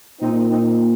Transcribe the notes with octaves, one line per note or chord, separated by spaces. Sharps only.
A#2 C4 D#4
C4 D#4